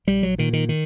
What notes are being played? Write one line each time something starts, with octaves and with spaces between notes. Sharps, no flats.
A#1 G3
F#3
A#2 D#3
D#3
D#3